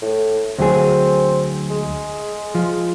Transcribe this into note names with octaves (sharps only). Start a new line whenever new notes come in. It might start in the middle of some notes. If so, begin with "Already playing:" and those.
A2
D2 F#3 C4 G#4
G#3
F3